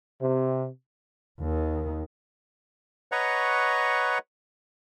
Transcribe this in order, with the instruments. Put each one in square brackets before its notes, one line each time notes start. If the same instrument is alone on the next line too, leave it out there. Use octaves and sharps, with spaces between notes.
[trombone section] C3
[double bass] D#2 D#3
[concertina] B4 C#5 D#5 F#5 A#5 C#6